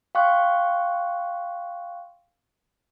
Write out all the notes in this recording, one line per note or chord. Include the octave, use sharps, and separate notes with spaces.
F5 G5 C6 C#6 F#6